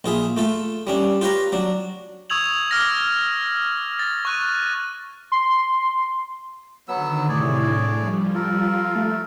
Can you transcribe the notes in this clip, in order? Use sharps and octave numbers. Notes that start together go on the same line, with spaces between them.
A#1 F4 G#4 E5
A3 F4 A4
G3 C#4 D4
F4 G4 B4 C#5 A#5
F#3 D4
C#6 D#6 E6 G#6 F7 F#7
D6 F6 A#6
A6 A#6
C#6 F#6 D#7
C6
D3 D#3 F#3 B3 E6
A2 C3 E4 G#4 C#5 D5
D4
F3 G3
F4 A4 A#4
A3